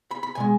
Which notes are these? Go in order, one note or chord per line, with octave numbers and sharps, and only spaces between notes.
B5
B5
B2 G#3 G#5